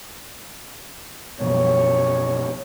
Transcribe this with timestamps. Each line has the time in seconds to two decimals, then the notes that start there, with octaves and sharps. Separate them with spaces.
1.40 F#2 B2 F3 C#5